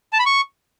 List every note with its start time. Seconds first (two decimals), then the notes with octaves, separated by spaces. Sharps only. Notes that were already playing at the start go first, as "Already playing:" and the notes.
0.13 A5
0.19 B5
0.26 C#6